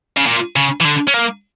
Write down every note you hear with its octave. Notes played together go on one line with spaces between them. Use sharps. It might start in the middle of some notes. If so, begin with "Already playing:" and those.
C#3
A#2
C#3
E3
D3
C#4
A#3